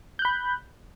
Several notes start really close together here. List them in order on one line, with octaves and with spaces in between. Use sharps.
G6 F#6 B5